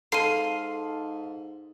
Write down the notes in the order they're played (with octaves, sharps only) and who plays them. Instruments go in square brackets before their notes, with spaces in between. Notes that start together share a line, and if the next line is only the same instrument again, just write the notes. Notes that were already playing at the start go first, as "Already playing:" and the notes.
[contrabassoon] G#2 [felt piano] A4 [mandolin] F5 C6 [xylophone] C7 D#7